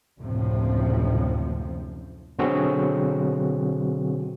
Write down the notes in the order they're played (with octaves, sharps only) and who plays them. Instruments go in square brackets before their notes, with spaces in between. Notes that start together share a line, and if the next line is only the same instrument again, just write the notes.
[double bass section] F#1 D2 A2 C3 F3
[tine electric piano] B2 D3 F#3 C4 F#4 G#4